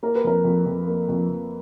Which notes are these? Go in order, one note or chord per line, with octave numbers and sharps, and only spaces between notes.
A#3 A#4
B4
F2 A#4
F2
F2
A#3
F2
F2